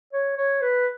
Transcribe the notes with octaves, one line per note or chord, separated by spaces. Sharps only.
C#5
C#5
B4